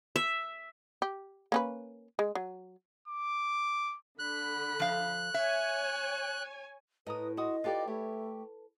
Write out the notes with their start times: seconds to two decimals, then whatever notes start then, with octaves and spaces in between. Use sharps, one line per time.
0.16 E5
1.02 G4
1.52 A#3 C#4 B4
2.19 G#3
2.35 F#3
3.08 D6
4.19 D3 B5 F#6
4.80 F3 F5
5.34 C#5 E5 G#5
7.07 A2 B4 D#5 A#5 D#6
7.37 F#4 D#5 C6 D#6
7.64 F4 G4 A4 B4 D5
7.87 A3 E4 G4 C#5